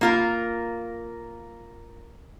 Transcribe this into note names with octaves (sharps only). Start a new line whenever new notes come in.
A#3 F4 A#4